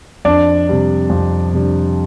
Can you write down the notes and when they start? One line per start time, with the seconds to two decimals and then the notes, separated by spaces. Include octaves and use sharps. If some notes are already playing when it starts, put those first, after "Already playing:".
0.25 F2 D4 D5
0.67 C3 G3 D4
1.10 F2
1.53 C3 G3 D4